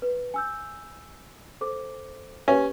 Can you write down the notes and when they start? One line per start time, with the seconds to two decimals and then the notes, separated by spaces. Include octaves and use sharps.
0.02 B4
0.34 G#5 E6 G6
1.61 A4 C5 D6
2.48 C#4 G4 B4